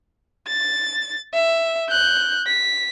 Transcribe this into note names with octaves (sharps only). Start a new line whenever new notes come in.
A6
E5
F#6 G6
B6